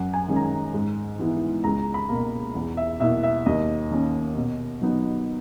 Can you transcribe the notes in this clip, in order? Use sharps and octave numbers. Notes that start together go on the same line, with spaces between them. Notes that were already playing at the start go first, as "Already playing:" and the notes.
Already playing: F#2 F#5
G#5
D#3 G#3 C#4
A#5
G#5
G#2
E3 B3 E4
C#2 A#5
B5
B2 A#3
E2
E5
B2 A#3 E4 E5
E5
D#2 D#5
D#3 A#3 C#4
B2
F#3 B3 D#4